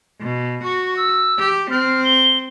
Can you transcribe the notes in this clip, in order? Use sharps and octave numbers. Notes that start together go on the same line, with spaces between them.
B2
F#4 C#6
E6
G4
C4 F6
G7